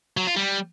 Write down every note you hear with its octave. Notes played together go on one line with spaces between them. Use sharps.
F#3
F4
G3